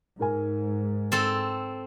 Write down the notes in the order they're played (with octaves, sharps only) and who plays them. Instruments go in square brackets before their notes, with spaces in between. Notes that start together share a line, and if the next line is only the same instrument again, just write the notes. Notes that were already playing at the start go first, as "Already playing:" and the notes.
[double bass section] G#2 [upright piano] D#4 A#4 G#5
[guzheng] C4 A4